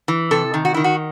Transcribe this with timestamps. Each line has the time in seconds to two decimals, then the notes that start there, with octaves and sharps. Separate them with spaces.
0.08 E3
0.31 C3 A4
0.54 D#3
0.65 F#4
0.74 D#3 E4
0.84 F#4